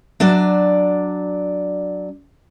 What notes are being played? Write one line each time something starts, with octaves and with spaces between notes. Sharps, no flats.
F#3 D4 D5